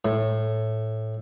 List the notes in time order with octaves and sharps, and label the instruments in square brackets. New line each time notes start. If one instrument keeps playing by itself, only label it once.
[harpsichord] A2